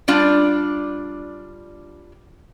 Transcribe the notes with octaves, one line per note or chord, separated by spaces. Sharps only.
G3 D4 F4